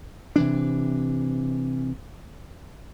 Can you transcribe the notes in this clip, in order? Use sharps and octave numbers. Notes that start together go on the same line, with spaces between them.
C3 E3 D4